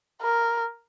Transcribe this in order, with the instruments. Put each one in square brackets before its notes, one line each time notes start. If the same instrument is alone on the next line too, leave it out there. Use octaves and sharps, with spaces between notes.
[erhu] A#4